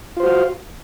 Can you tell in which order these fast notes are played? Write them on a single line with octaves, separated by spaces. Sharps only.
F4 C5 F#4 F5